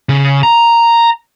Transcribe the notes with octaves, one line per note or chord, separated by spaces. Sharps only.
C#3
A#5